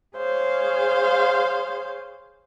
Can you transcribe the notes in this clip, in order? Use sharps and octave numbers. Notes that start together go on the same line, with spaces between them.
G#4 C5 C#5 F5